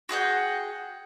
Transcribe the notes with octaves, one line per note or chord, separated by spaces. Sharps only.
F#4 G#4 F#5 G5